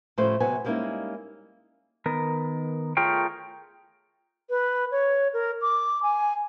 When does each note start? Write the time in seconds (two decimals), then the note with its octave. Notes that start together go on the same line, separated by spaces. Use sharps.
0.18 A2 C#3 F3 G3 A3 C5
0.40 C3 F#3 A3 B3 C5 G#5
0.65 G3 G#3 A#3 C#4 D#4 E4
2.06 D#3 B3 A#4
2.97 A3 F4 G#4 A#4 C#5 G5
4.50 B4
4.92 C#5
5.33 A#4
5.61 D6
6.03 G#5